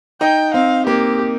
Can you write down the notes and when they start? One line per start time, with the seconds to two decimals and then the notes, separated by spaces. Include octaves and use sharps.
0.21 D#4 G5
0.54 C4 F5
0.86 A#3 G4